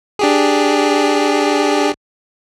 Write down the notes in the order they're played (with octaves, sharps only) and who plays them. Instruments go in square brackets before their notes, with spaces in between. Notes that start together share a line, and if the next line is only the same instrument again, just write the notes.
[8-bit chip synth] D4 G4 G#4